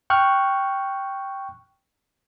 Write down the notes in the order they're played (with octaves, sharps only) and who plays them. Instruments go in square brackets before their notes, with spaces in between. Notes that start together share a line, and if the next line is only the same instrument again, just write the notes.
[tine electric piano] G5 C#6 F6 F#6